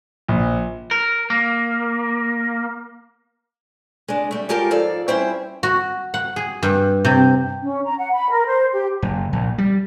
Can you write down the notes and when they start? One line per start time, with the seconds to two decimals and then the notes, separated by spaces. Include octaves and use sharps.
0.28 A#1
0.91 A#4
1.30 A#3
4.08 G#3 D4
4.31 G3 A3
4.49 G#3 F4 G4 A4 A#4
4.71 G#2 F3 A4 D5 F5
5.08 G3 C#4 E4 C5 E5 G5
5.63 F#4
6.14 F#5
6.36 G#4
6.63 G2
7.05 C3
7.62 C#4
7.85 A#5
7.98 F#5
8.13 B5
8.30 A#4
8.46 C5
8.72 G4
9.02 F#1
9.33 A#1
9.58 G3